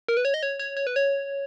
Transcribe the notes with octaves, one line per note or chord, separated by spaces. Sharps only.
A#4
B4
C#5
D#5
C#5
C#5
C#5
B4
C#5